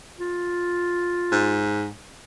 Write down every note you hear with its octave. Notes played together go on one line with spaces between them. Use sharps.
F4
G#2